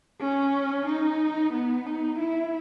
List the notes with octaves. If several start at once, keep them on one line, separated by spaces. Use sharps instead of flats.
C#4
D#4
B3
D#4
E4